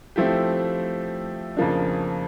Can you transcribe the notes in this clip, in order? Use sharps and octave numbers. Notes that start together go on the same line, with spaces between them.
F3 A3 C4 E4 G4
F2 C#3 F3 A#3 D4